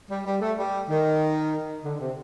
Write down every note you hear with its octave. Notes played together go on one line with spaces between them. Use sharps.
G3
G3
A3
G3
D#3
D3
C3